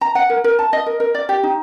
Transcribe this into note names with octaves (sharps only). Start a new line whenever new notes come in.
A#5
F#5
A#4
A#4
A5
D#5
A#4
A#4
D5
G4
D#4